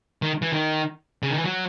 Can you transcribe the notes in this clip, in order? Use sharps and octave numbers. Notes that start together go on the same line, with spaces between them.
D#3
E3
D#3
C#3
D#3
E3
F#3